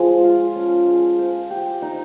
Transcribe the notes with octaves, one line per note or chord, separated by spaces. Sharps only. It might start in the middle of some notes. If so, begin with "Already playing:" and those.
Already playing: F3 G#3
F4
C#4
G#3
C5
G4
D#4